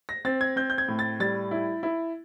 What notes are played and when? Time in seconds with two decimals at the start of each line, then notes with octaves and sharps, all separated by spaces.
0.09 A#6
0.25 C4 A6
0.41 G#6
0.56 C4 G6
0.70 G6
0.78 G#6
0.88 A2
0.99 A6
1.20 G3 A6
1.51 E4
1.83 E4